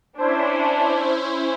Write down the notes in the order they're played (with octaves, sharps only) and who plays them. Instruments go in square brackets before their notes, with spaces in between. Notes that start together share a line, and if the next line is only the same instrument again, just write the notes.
[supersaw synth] C#4 E4 C5 [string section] D4